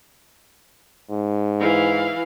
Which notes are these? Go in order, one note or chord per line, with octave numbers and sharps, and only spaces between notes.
G#2
E3 F5